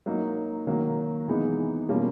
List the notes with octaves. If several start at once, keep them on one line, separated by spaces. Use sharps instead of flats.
F#3 A#3 D#4
D#3 F#3 A#3
C3 E3 G#3 B3 D#4
B2 G3 A#3 C#4 F4